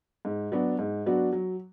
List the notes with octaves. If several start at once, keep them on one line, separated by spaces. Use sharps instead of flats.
G#2
F#3 B3 D4 F#4
G#2
F#3 B3 D4 F#4
F#3